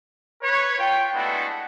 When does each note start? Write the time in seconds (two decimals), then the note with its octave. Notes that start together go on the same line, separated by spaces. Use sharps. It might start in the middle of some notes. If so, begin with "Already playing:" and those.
0.42 B4 C#5
0.79 F4 G5
1.14 G#3 A3 B3 D4 E4 F#4